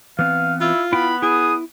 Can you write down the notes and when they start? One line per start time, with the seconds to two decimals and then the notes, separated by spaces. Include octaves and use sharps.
0.19 E3 B3 C4 F5
0.61 E4 F4
0.93 B3 E4 G5 B5
1.22 E4 G#4 D#6